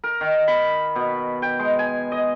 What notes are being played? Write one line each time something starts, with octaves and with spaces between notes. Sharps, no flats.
A#4
D#3
B5
B2
G5
G#3
G#5
D#5